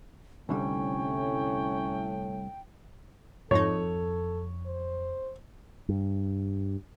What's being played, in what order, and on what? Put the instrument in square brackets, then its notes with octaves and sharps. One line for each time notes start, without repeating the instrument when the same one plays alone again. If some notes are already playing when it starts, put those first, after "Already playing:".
[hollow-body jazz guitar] C2 D3 G3 [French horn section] A2 [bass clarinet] C#4 [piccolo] G5
[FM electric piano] F2 [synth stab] G#2 F3 D#4 [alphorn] A4 [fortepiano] C#5
[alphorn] C5
[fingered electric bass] G2